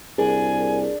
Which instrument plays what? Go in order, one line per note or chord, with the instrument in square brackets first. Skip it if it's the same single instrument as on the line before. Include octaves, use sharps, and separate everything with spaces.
[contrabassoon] C2 [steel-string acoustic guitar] D4 [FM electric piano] G#4 A#4 [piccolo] G#5